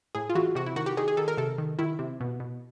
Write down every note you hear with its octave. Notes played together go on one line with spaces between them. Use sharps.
A2 G#4
F4
E3 F#4
C3 F#4
E4
D#3 F#4
G4
D#3 G#4
G#4
D#3 A4
A#4
C3 A4
D#3
D#3 E4
C3
B2
B2